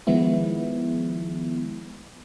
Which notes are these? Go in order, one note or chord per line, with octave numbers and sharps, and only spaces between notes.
D#3 F3 G#3 B3 E4